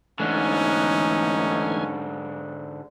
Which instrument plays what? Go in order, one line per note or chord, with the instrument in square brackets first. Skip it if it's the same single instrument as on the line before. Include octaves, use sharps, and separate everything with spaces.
[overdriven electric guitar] G#2 D3 [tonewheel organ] E3 A3 G#5 [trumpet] C#4 [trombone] D#4